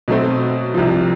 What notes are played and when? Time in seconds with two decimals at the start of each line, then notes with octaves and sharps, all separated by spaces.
0.08 B2 F#3 A3 C4
0.74 C2 C3 F3